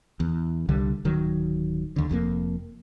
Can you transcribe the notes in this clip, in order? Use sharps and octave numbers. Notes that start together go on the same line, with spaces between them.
E2
C2 D3 G3
D1 D#3 F#3
D#2 D3
F1 F2 D3 A#3